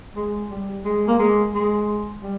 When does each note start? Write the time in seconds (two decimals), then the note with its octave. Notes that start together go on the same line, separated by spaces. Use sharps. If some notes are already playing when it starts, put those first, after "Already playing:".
0.16 G#3
0.51 G3
0.85 G#3
1.08 A#3
1.19 G#3
1.54 G#3
2.23 G3